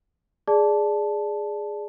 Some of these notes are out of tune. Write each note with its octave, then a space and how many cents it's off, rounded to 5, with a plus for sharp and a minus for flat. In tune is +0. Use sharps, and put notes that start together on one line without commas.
G#4 +0 D5 +0 A5 -10